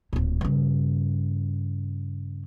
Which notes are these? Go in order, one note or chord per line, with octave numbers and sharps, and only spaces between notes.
D1 A#2
G2 C#3